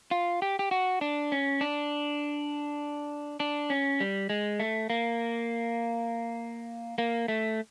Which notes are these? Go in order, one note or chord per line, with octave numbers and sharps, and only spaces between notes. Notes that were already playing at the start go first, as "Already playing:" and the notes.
F4
G4
G4
F#4
D4
C#4
D4
D4
C#4
G3
G#3
A3
A#3
A#3
A3